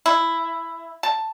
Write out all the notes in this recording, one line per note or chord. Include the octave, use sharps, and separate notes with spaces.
E4
A5